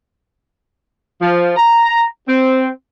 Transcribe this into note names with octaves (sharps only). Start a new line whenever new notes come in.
F3
A#5
C4